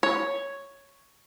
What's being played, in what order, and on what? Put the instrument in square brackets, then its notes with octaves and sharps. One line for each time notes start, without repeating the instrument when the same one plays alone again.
[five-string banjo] C#5